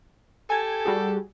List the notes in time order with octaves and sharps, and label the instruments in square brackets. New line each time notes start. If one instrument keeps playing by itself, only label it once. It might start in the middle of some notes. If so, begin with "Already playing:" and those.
[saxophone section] G4 A4 [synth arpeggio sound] G#5 G#6
[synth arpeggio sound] G3 F#4 G#4